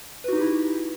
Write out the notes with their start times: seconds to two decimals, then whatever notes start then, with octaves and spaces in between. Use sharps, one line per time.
0.24 B4
0.28 F#4
0.33 D#4
0.37 G4
0.41 E4